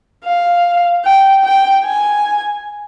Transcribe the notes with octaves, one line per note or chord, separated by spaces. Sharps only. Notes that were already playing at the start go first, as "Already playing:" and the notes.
F5
G5
G5
G#5